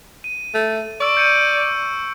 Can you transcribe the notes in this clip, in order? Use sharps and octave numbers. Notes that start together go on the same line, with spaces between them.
D#7
A3
D5 C#6 E6 D7
G6 C#7 D#7